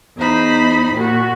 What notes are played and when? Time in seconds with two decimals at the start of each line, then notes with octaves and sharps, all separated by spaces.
0.17 E2 D#4 C5 B5
0.94 A#2 F#4